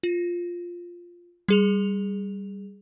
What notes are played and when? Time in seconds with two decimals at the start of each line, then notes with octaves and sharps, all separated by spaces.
0.03 F4
1.48 G3 G#4 F7